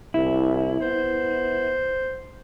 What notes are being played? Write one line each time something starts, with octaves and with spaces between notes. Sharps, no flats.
C2 E4
B3 C5